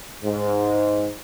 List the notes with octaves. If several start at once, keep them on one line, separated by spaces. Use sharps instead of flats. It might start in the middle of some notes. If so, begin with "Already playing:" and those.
G#2